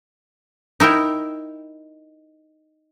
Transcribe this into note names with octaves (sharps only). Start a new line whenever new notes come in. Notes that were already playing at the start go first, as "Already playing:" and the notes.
D#4 E4 A#4 G5